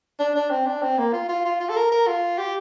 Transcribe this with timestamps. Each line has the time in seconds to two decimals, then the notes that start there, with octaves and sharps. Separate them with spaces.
0.19 D4
0.35 D4
0.51 C4
0.66 D4
0.82 C4
0.98 A#3
1.13 F4
1.29 F4
1.45 F4
1.60 F4
1.69 A4
1.76 A#4
1.92 A#4
2.07 F4
2.38 G4